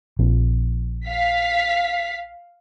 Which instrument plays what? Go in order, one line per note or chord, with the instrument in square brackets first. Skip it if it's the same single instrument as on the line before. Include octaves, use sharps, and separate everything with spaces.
[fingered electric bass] A#1 F3 C4
[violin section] F5 B6